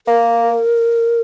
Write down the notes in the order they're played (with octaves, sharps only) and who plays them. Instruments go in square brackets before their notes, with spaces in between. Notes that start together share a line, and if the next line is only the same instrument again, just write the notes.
[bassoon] A#3 [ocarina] A#4